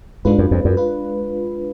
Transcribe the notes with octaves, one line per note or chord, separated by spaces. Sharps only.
G#2 G#3 D4 F4 B4
F#2
F2
F#2
F4 B4